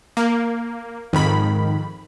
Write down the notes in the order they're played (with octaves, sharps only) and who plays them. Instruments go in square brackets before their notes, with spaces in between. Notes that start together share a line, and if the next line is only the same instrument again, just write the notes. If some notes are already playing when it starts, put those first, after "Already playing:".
[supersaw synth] A#3
[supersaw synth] F2 B5 [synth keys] G#2 D#3